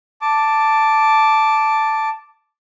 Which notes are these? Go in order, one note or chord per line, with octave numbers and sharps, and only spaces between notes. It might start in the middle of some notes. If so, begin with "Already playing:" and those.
A5 D6